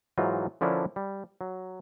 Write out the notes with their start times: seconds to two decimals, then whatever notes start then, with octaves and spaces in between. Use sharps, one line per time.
0.18 G#2 E3 F#3 D#4 F4
0.61 D3 F3 C#4 D4 E4 A#4
0.96 G3
1.41 F#3